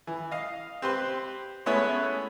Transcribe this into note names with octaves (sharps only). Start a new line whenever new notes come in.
E3
D#5 F5
C4 G4 B4 C6
G#3 A3 B3 C#4 E4 C#5